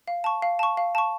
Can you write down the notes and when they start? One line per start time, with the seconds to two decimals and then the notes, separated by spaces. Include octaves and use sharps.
0.07 F5
0.24 A5 C#6
0.42 F5
0.59 A5 C#6
0.77 F5
0.95 A5 C#6